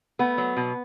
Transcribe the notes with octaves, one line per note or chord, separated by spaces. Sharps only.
A3 B3
F#3
B2